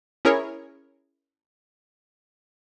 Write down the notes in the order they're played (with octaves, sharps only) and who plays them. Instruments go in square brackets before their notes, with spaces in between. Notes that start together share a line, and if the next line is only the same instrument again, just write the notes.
[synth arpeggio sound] C#4 E4 G#4 A#4 C#5